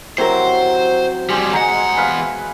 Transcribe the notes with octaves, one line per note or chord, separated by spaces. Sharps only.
C3 F#3 E4 A#4 C5
F2 G3 G#4 C5
E2 G#3 D#5 F#5 A#5
B4 F5